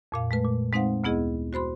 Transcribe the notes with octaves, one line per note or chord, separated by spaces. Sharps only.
F2 A#2 F5
G#3 A3 B4
A#2
G#3 C4 D#4 C5 F5 F#5
D2 B3 E4 G#4 D#5
F#4 C5 B5 C6